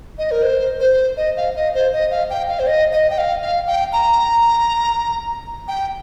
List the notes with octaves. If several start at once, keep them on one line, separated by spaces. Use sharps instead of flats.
D#5
A#4
C5
C5
D#5
F5
D#5
C5
D#5
F5
G5
F5
C5
D#5
D#5
G5
F5
F5
G5
A#5
G5